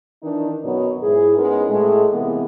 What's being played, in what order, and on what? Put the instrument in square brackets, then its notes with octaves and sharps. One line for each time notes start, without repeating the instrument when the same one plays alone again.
[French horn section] D#3 E3 D4 D#4
F#2 B2 F#3 B3 D#4 C#5
G#2 E4 G#4
G#3 B3 C#4 D#4 A#4
A2 G#3
C3 E3 G#3 A#3 B3